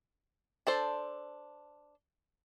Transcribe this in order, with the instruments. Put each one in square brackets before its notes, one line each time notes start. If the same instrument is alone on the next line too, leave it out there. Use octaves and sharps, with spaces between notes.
[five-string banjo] D4 A4 C5